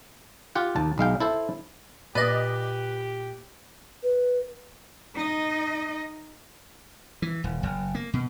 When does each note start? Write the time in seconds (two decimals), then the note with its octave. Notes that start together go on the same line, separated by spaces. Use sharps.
0.55 F4 G4 F#5
0.76 D#2 A5
0.98 B1 G#3 F5 G5
1.20 E4 A4 C5
2.15 A#2 G4 B4 D5 D#5
4.03 B4
5.15 D#4 D#5
7.22 E3
7.44 D#1
7.63 F#1
7.95 A#3
8.14 B2